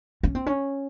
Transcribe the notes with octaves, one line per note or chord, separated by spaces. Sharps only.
C#4
C4
C#4